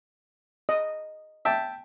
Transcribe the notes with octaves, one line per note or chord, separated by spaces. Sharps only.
D#5
E5 G5 A5